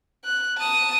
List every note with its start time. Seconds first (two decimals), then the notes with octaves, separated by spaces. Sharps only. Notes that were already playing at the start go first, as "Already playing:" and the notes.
0.25 F#6
0.58 A5 D#6